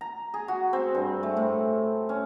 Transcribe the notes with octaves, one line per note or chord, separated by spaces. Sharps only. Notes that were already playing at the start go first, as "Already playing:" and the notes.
A#5
G#4
F#4
C4
G2
A3
A2
C#4